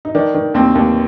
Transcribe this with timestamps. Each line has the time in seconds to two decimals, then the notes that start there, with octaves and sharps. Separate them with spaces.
0.05 D#4
0.15 D#3 D4
0.34 D#3
0.54 D#2 C4
0.75 D#2